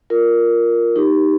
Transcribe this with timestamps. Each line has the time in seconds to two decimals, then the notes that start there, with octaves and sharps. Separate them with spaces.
0.10 F4 A#4
0.96 D#4 G4